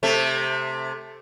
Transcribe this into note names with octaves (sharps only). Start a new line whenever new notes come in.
C3 A3